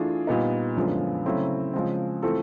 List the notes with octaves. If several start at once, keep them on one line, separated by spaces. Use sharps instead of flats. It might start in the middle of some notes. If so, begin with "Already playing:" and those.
Already playing: E3 A3 D4 F4 G#4
A#2 G3 B3 D#4
F#2 D3 F3 G#3 B3
C#3 F#3 A3 C4 E4
C#3 F3 G#3 C4
E3 A3 C4 F4 A4